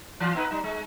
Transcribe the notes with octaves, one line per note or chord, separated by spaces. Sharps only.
E3 F4
B3 D#4 B4
G3 D#4
G#3